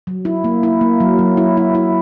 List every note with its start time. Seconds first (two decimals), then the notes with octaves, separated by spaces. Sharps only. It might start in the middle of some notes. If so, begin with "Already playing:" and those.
0.07 F#3
0.25 E4
0.44 A#3
0.63 E4
0.81 A#3
1.00 F#3
1.19 F#3
1.37 E4
1.57 E4
1.75 E4